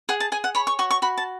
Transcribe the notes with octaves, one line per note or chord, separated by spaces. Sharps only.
G#4 F#5
A5
G#4 G#5
F#5
C#5 B5
C#6
F#4 C#6
C#6
F#4 B5
A5